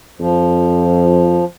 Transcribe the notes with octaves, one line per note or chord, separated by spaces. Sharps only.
F2 F3